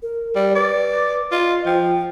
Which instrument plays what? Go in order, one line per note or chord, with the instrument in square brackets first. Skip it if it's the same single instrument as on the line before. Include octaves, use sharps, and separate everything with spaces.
[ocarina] A#4
[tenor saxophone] G3 [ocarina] D5
[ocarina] B4 [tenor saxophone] D5
[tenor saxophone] F4 [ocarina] D#5
[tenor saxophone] F3 [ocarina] G5